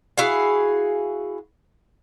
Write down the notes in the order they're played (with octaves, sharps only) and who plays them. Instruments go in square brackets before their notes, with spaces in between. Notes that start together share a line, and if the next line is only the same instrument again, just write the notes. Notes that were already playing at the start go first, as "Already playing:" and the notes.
[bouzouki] E4 F#4 G#4 F5